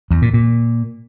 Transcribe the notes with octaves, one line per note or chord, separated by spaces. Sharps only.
E2
A#2
A#2